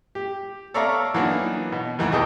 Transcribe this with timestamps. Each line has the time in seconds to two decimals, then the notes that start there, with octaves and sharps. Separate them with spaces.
0.15 G4
0.74 A4 C#5 D5 E5 F5 A#5
1.14 E3 F#3 A#3 B3 D4 D#4
1.72 B2
1.99 D#2 E3 B3
2.11 B1 E2 G#4 A4 D#5 G5